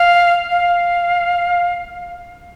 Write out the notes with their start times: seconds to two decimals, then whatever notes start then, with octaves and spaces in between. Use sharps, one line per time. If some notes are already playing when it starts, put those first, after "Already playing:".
Already playing: F5
0.50 F5